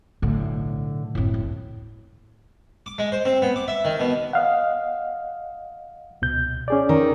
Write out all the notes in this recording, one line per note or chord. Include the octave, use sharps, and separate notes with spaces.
B1 A2 D3
F#1 A2 C4
D2
D6
G#3
C5
C4
B3
D6
E5
D#3
B2
D#5 F5 F#5
C#2 B2 G6
C#4 G#4 D5
D#3